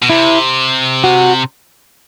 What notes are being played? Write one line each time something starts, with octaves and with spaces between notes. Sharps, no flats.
B2
C3 E4
F#4